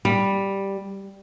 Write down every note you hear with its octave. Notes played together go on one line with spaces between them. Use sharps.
G3